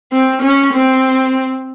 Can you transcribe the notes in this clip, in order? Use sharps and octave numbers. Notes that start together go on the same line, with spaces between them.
C4
C#4
C4